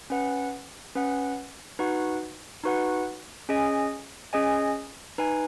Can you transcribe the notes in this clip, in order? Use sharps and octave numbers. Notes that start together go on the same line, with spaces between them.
C#4 B4 F#5
C#4 B4 F#5
D#4 F#4 B4 F#5
D#4 F#4 B4 F#5
C#4 G#4 D#5 G#5
C#4 G#4 D#5 G#5
D#4 B4 G#5